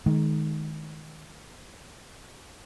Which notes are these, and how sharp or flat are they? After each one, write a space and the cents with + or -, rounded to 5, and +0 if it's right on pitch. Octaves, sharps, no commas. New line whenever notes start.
D#3 +0 G#3 +30